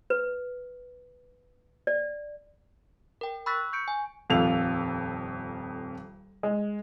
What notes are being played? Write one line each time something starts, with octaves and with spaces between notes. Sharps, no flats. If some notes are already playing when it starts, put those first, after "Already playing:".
B4
D5
A#4 G5
B5 C#6 E6 F#6 A6 B6
C#6 G6 C#7 D7
G#5
D#1 F2 A4 F5 F7
G#3